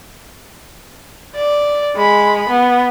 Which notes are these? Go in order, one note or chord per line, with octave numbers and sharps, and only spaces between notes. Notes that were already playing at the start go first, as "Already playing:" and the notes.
D5
G#3 B5
B3